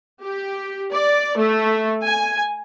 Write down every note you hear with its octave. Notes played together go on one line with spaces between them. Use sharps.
G4
D5
A3
G#5